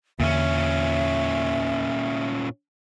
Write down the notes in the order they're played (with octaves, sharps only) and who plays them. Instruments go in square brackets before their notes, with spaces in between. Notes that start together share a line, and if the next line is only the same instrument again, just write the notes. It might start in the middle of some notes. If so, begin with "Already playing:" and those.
[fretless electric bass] E2 D3 A#3 [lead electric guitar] A#2 C#4 [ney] E5